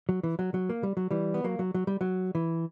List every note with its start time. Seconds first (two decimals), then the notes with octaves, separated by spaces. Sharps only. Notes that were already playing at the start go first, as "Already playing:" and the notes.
0.09 F#3
0.23 E3
0.39 F#3
0.54 F#3
0.69 A#3
0.83 G3
0.97 F#3
1.11 E3 G3
1.34 B3
1.44 F#3 A#3
1.59 F#3
1.74 F#3
1.87 G3
2.01 F#3
2.35 E3